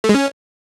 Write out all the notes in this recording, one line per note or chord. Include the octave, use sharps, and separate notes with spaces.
A3
G#3
C#4